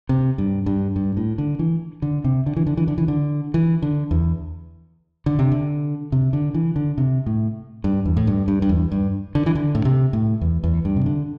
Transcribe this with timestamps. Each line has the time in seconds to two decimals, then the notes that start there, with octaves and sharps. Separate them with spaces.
0.09 C3
0.38 G2
0.66 G2
0.96 G2
1.17 A2
1.38 D3
1.59 E3
2.02 D3
2.24 C3
2.46 D3
2.56 E3
2.67 D3
2.77 E3
2.88 D3
2.98 E3
3.08 D3
3.54 E3
3.82 D3
4.11 E2
5.26 D3
5.39 C3
5.52 D3
6.12 C3
6.33 D3
6.54 E3
6.76 D3
6.98 C3
7.26 A2
7.84 G2
8.06 E2
8.17 A2
8.27 G2
8.48 G2
8.62 G2
8.69 E2
8.92 G2
9.35 D3
9.46 E3
9.55 D3
9.75 A2
9.85 C3
10.13 A2
10.41 E2
10.64 E2
10.85 G2
10.96 C3
11.06 D3